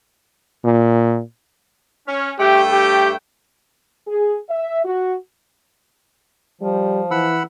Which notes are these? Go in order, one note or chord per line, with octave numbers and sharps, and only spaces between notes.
A#2
C#4
G2 A3 G4 G5
G4
G#4
E5
F#4
F3 G3
E3 F#5 B5 E6